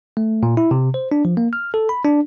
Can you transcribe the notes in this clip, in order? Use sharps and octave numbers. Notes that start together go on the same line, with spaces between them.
A3
A#2
E4
C3
C5
D4
F3
A#3
F6
A4
B5
D4